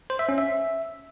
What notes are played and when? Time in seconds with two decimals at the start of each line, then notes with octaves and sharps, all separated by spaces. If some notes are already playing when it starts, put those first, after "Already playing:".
0.10 C5
0.19 E5
0.29 C#4
0.38 E5